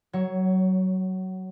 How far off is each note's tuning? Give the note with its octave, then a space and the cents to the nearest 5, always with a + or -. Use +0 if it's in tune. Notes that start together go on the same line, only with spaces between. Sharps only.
F#3 +20 C#5 +0